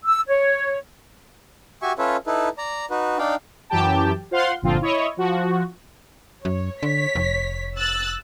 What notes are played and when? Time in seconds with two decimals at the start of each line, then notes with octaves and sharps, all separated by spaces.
0.05 E6
0.28 C#5
1.82 F#4 G4 E5 G#5 C#6
1.98 C#4 F4 A4 B4 C#5 E5
2.27 D#4 E4 A4 B4
2.58 D5 A#5
2.90 D#4 F#4 B4
3.18 D4 D#4 D5 F5 G5
3.70 F#2 E3 F#3 G4 G5 A5
4.31 F4 C5 F5 F#5 C6
4.62 G1 A#2 D3 F3 C4 F4
4.81 E4 C#5 D#5
5.17 F3 F#4
6.45 F#2 C#5
6.83 D3 C#5 B6
7.15 F1
7.76 E6 F#6 A6